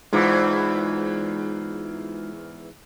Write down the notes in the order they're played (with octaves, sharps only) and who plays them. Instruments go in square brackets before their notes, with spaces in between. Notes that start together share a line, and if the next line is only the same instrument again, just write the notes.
[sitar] E2 G#2 E3 [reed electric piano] G#3 D#4 F4